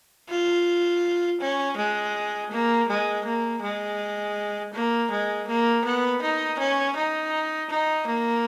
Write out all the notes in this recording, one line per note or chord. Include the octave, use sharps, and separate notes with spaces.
F4
C#4
G#3
A#3
G#3
A#3
G#3
A#3
G#3
A#3
B3
D#4
C#4
D#4
D#4
A#3